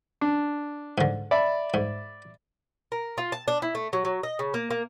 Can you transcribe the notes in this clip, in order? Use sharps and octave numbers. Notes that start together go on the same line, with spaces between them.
D4
G#2 D3
D5 E5 B5
G#2
A#4
F4
A5
D4
E4
A3
F#3
F#3
D#5
C#3
A#3
A#3